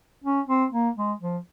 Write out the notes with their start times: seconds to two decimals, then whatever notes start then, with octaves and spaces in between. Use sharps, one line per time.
0.24 C#4
0.48 C4
0.72 A#3
0.96 G#3
1.21 F3